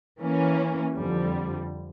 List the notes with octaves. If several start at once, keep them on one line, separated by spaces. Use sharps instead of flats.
E3 A#3 C#4
F2 D3 G3